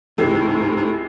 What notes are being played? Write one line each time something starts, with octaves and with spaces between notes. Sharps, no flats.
C#2 G#2 C3 E3 G#3 C4
A2
G#2
A2
G#2
A2
G#2
A2
G#2
A2